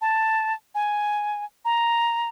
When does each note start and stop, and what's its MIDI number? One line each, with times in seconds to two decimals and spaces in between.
0.01 0.54 81
0.75 1.45 80
1.65 2.29 82